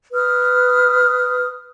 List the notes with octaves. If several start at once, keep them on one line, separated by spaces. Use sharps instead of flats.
B4 D#6 F6